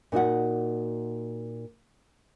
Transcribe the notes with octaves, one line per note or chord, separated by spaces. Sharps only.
A#2 D#4 F#4 F#5